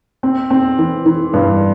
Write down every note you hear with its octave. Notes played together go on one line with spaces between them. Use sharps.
C4
C4
E3
E3
G2